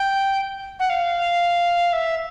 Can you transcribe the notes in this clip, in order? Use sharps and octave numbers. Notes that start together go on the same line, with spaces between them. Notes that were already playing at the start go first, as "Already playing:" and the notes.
Already playing: G5
F#5
F5
E5